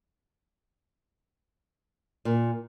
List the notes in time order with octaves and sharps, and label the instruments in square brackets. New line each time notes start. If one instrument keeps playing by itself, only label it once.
[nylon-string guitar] A#2